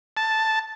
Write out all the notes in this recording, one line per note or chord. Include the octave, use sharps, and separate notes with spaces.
A5